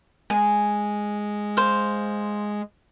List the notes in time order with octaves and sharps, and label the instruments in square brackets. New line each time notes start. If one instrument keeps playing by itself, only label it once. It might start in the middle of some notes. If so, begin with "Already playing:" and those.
[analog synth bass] G#3 [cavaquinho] G#5
[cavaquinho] C5 F5